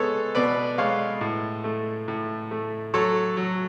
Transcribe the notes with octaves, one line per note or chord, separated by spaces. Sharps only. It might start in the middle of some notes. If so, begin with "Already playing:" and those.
Already playing: G#3 B3 G#4 A4 C#5
B2 B4 D5
G#3 C#5 F5
A2
A3
A2
A3
F#3 A4 C#5
F#3